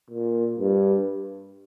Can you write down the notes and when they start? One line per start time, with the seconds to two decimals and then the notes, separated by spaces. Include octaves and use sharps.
0.10 A#2
0.60 G2